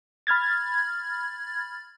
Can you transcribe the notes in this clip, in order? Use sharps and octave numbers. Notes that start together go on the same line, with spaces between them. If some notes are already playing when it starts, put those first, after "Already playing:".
B5 F6 G#6 A6